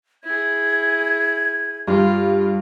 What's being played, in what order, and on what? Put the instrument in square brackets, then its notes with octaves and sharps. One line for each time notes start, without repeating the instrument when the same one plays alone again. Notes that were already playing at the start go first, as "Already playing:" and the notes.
[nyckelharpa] E4 G#4 [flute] G#6
[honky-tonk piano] G2 [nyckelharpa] F4